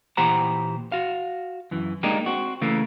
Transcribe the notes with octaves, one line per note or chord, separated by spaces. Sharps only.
A#2 E3 G4 C5 F#5 A#5
F#4 F5
F#2 E3
G#3 A#3 D4 D#4 G4
C4 F#4
C#3 E3 A3 A#3